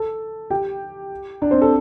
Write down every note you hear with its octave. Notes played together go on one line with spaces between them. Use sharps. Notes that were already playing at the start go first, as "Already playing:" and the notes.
Already playing: A4 A5
G4 G5
D4 D5
C4 C5
A4